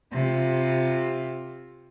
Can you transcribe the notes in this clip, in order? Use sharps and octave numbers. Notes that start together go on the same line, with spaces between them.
C3 F4